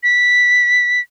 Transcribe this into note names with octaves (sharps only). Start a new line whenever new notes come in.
B6